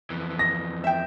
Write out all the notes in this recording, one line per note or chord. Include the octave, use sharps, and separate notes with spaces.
F2 E3
A#6
E5 G5